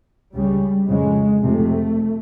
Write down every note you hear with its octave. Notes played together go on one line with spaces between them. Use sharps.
C#2 C#3 G3
F2 C#3 G#3
F2 C3 A3